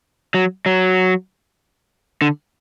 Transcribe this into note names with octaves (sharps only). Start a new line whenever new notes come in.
F#3
F#3
D3